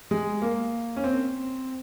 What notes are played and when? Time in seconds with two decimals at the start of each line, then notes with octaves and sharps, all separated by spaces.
0.11 G#3
0.42 A#3
0.97 C#4
1.04 C4